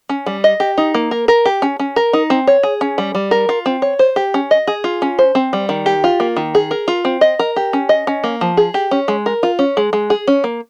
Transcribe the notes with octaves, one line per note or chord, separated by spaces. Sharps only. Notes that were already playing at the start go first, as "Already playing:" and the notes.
C#4
G3
D#5
G4
D#4
A#3
A#4
A#4
G4
C#4
C#4
A#4
D#4
C4
C#5
G#4
C#4
G3
G3
A#4
F4
C4
C#5
C5
G4
C#4
D#5
G#4
F4
C#4
C5
C4
G3
D#3
G4
F4
A#3
D#3
G#4
A#4
F4
C4
D#5
A#4
G4
C#4
D#5
C#4
A#3
F3
G#4
G4
C#4
G#3
A#4
F4
C#4
G#3
G#3
G#4
C#4
A#3